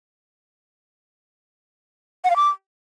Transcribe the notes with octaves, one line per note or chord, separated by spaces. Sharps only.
F#5
F5
D6